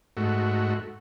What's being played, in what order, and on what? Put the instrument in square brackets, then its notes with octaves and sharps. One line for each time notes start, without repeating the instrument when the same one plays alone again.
[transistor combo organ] G#2 A3 F#4